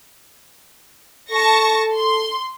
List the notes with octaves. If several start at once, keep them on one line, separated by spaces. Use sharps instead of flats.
A4 A5 C#6 A#6
C6